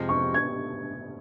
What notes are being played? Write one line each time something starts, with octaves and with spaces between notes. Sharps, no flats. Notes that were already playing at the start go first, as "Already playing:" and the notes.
Already playing: F2 C3 F3 G#3
C#6
G#6